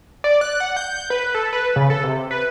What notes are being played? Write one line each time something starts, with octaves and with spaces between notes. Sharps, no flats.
D5
F#6
F#5
G6
B4
A4
B4
C#3
A4
C3
B4